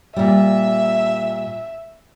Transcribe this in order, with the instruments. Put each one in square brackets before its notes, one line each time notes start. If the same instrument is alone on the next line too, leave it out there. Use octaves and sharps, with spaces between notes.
[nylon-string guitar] A#2 G3 [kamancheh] E5